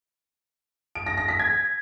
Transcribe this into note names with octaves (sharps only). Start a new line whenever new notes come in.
D7
A#6
A#6
B6
G#6